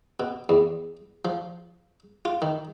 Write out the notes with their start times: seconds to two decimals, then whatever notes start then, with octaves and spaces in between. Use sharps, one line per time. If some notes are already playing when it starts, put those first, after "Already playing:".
0.20 B2
0.49 E2
1.25 F3
2.25 F4
2.42 D#3